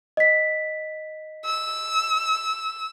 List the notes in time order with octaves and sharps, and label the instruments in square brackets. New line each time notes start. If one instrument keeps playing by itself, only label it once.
[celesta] D#5 B6
[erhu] E6